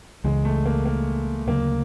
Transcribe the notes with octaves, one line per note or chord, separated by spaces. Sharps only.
C#2 C#3 E3 G#3
A3
A#3
A#3
D2 C#3 F#3 A3 A#3